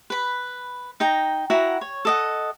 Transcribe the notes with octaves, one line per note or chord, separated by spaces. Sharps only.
B4 B5
D#4 G5 A#5
E4 F#4 F#5 A#5
C#5
A4 D#5 F#5